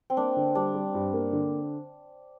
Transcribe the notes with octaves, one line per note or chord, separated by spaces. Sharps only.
C4
A#3 D4
D3
G3 D4
G3
G2
A#3
D3